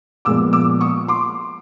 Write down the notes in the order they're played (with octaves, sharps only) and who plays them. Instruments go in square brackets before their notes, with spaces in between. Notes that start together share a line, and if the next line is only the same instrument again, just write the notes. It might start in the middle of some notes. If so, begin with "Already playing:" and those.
[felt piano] A#2 F3 G#3 B3 D6 E6
D6 E6
C#6 D#6
C6 D6